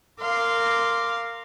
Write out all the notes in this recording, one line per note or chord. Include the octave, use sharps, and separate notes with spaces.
A#4 F5 C6 D6